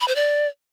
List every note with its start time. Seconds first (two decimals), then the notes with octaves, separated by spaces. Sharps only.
0.01 B5
0.08 C5
0.16 D5